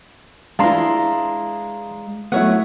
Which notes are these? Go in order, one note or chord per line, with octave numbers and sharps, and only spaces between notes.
E3 G#3 D4 F5 A#5 C6
F#3 A3 B3 E4 C#5 F#5